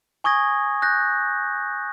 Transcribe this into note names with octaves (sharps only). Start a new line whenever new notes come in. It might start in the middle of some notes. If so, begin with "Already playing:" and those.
G#5 C#6 D#6 G#6 A#6
F#6 G6 A#6